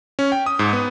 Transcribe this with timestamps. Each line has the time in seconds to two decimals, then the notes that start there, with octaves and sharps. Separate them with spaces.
0.19 C#4
0.32 G5
0.46 D#6
0.59 G#2
0.73 B3